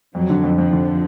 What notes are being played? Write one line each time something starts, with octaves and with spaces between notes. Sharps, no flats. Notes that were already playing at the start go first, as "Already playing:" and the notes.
F2 F#3
D3
F2
F2 F3
D3